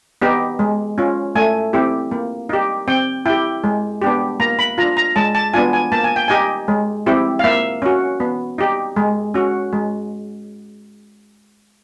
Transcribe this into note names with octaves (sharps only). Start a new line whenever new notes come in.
B3 D#4 G4
G#3
C#4 F4
A3 G#5
C4 E4 G4
A#3
D#4 G4
C4 G5
E4 G4 G5
G#3
B3 D4 G4
A#3 A#5
B5
D4 F4 A#5
A#5
G#3 A5
A5
B3 D4 F4 G#5
G#5
A#3 A5
G#5
G5
D#4 G4 G#5
G#3
C4 E4 G4
F5
A#3 E5
C#4 F#4
B3
D#4 G4
G#3
C#4 F#4
G#3